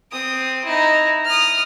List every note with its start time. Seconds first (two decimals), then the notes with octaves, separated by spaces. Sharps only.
0.12 C4 D#6
0.64 D#4 E4
1.25 D#6 F6